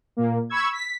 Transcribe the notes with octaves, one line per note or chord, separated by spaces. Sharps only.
A#2 A#3
B5 C#6 E6 G#6
B6